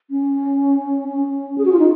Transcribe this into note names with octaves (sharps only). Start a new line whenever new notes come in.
C#4
C#4
G#4
F#4
F4
D#4